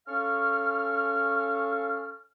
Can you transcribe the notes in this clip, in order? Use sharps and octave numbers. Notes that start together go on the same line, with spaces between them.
C#4 A4 F5 C#6 F6